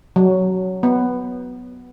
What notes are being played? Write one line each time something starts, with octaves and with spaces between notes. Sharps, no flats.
F#3
B3